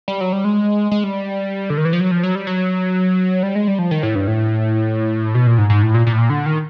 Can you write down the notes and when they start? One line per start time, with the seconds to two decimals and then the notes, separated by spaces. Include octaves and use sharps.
0.08 G3
0.21 F#3
0.33 G3
0.44 G#3
0.91 G#3
1.04 G3
1.70 D3
1.77 D#3
1.85 E3
1.93 F3
2.00 F#3
2.11 F3
2.23 F#3
2.35 G3
2.47 F#3
3.43 G3
3.55 G#3
3.68 G3
3.79 F3
3.91 D#3
4.03 A2
4.15 G2
4.27 A2
5.35 B2
5.47 A#2
5.58 G#2
5.70 G#2
5.82 A2
5.94 A#2
6.07 A#2
6.13 A2
6.18 A#2
6.30 D3
6.46 D#3